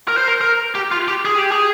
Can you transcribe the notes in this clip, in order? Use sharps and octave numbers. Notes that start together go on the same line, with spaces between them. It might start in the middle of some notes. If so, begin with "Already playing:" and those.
A#4
C5
A#4
A#4
G4
F4
G4
G#4
G4
G#4